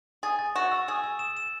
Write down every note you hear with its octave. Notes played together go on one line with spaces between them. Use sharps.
G#4 A6
A6
F#4 E7
E6
G#4 E6
E6
E7
E7